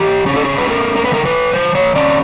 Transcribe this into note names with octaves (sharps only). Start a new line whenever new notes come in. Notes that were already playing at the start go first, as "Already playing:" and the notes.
Already playing: E3 G4
C#4 G#4
A4
G#4
B4
A3 A#4
A#4
B4
E3 A#4
B4
E3 C5
C#5
C#4 D5